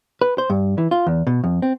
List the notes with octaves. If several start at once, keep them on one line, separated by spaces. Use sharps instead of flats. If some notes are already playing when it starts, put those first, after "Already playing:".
B4
C5
G2
E3
F4
E2
B2
F2
C4